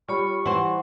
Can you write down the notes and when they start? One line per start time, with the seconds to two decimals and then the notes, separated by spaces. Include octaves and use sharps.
0.09 G3 F4 C#5 B5 C#6
0.46 E3 C5 F#5